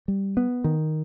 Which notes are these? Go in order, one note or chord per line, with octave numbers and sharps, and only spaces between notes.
G3
B3
D#3